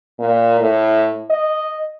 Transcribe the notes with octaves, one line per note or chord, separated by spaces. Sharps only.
A#2
A2
D#5